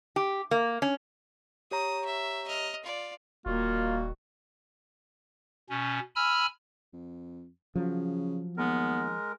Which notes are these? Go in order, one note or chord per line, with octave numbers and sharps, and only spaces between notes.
G4
A#3
C#4
G4 C#5 A#5 D#6
E5
D#5 F6
F4 D5
D#1 D#3 G3 A#3 F4 F#4
B2 C#4
G#5 B5 E6 F6
F2
C#3 F3 F#3
D#2 G#3 B3 A#4